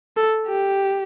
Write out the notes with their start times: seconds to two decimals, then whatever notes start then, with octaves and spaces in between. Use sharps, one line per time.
0.17 A4
0.48 G4